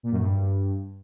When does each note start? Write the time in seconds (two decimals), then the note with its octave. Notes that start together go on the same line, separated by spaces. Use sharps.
0.03 A#2
0.12 F#2
0.20 G2